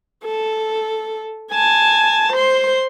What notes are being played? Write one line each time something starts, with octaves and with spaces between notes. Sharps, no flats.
A4
G#5 A5
C5 C6